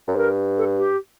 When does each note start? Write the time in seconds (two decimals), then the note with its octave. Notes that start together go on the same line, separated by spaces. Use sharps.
0.08 F#2
0.15 G2 A#4
0.57 A4
0.78 G4